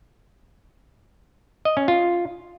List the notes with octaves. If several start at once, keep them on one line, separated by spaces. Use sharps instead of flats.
D#5
C#4
F4